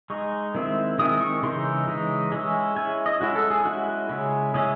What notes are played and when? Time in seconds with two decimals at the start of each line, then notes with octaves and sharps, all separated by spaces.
0.10 G#3 D#4 C#6
0.55 D#3 G#3 C4 E4
0.98 D#3 G#3 C4 E4 D#6
1.21 C#6
1.43 C#3 E3 G#3 D#4 C6
1.88 C#3 E3 G#3 D#4
2.32 G#3 C#4 E4
2.76 G#3 C#4 E4 G#5
3.06 D#5
3.21 G#3 C#4 E4 F#4
3.35 A4
3.50 G#4
3.65 G#3 C#4 E4 F#4
4.09 C#3 G#3 C#4 E4
4.54 C#3 G#3 C#4 E4 G#4